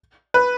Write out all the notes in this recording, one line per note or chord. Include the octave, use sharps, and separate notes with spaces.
B4